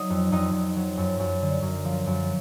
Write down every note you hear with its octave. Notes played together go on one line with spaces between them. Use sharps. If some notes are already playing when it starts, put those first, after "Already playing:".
Already playing: F#3 D#4 D#5
F2
F2 D#4 D#5
F2
F#3
F#2
F#2
D3
F#2
F3
F#2